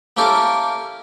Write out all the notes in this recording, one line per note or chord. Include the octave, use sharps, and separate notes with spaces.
A#3 C#4 E4 G4 A4 A#4